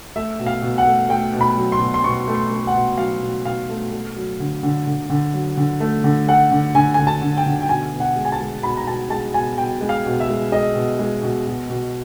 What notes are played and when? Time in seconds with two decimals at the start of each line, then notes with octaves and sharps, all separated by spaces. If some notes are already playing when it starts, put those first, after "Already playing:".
0.16 A3 E5
0.39 B2
0.46 F5
0.62 B2
0.78 F#5
0.85 A3
1.09 A3 G5
1.33 B2
1.41 B5
1.57 F#3
1.72 C6
1.80 B2
1.94 C6
2.04 B2 C#6
2.28 A3
2.35 C6
2.51 A3
2.67 F#5
2.74 B2
2.98 F#3 F5
3.22 B2
3.45 B2 F5
3.69 A3
3.92 A3
4.16 F#3
4.40 D3
4.63 D3
4.87 D3
5.10 D3
5.34 F#3
5.57 D3
5.80 A3
6.04 D3
6.28 A3 F#5
6.51 D3
6.75 D3 G#5
6.94 D3 G#5
7.07 A5
7.22 D3
7.37 G5
7.46 D3
7.62 G5
7.69 B2 G#5
7.93 B2
8.00 F#5
8.16 G#3
8.25 G#5
8.32 A5
8.40 G#3
8.63 B2 B5
8.77 A#5
8.87 B2 A5
9.10 G#3 A5
9.34 B2 G#5
9.58 B2 G5
9.81 G#3
9.89 F5
10.06 B2
10.20 E5
10.28 G#3
10.52 G#3 D#5
10.76 B2
10.99 G#3
11.23 B2
11.47 B2
11.70 B2